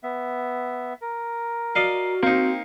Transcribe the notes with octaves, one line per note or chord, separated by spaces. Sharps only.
B3 E5
A#4
F#4 D5 D#5 F5
A#3 C4 D#4